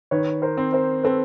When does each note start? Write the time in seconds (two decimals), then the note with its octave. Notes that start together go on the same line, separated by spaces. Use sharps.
0.11 D#3 B4 C#5
0.42 A#4 C5
0.57 C4
0.73 A#4 C5
1.04 C4 A4 B4